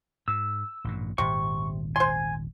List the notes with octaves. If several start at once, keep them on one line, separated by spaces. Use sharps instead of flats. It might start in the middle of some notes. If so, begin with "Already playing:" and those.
G#2 E6
A1 G2 A#2
D#1 G#1 C3 C#6
C5 G#5 C6